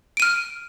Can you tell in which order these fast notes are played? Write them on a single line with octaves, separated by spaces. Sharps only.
D7 D#7 F6